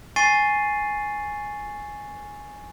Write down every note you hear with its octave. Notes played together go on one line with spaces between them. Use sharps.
G#5 C#6 A6 C7 D#7